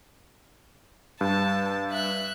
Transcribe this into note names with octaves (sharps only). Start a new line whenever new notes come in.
G2 A5
E5 F#6